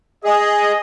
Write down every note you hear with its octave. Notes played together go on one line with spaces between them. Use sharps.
G#4 D#5